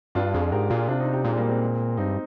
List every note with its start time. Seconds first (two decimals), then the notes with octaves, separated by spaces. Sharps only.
0.15 G2 D4 F4
0.33 F2 F4 G#4
0.52 G#2 G4 A#4
0.70 A#2 F4 G#4
0.88 C3 D4 F4
1.00 C4 D#4
1.13 D#4 G4
1.24 A#2 G#3 C4
1.37 G3 A#3
1.49 G#3 C4
1.97 G2 C4 D#4